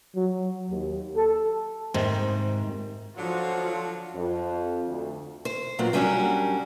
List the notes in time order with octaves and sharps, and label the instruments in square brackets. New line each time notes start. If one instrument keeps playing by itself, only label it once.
[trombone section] F#3
D#2
A4
[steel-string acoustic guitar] G#2 [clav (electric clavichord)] C3 D#3 C4
[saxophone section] D3 F#3 [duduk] F3 [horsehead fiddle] F4 F#4
[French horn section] F2
D2
[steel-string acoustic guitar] C5
A#2 F#3 B3 C4 D4
F#3 G3 C#4 D4 F#4 A#4